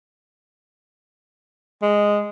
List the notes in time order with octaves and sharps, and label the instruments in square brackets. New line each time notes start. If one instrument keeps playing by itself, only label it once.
[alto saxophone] G#3